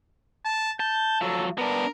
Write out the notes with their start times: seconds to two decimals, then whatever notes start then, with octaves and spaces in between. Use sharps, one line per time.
0.45 A5
0.80 A5 G6
1.21 F3 F#3 A4
1.58 B3 D4 A#4